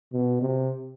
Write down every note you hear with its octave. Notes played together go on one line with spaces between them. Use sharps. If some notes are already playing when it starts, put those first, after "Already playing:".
B2
C3